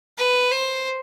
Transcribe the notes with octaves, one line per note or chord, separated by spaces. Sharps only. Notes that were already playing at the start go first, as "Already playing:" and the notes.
B4
C5